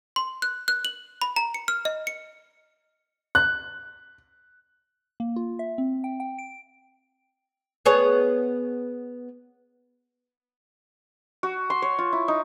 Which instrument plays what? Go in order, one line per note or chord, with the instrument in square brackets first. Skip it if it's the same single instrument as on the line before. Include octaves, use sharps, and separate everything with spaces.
[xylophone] C6
F#6
F#6
F#7
B5
A#5
C#7
F6
D#5
C#7
[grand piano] F#6
[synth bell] A#3
F4
E5
C4
G5
G5
D7
[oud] B3 G#4 C#5
[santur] F#4
C6
C#5
F4
E4
D#4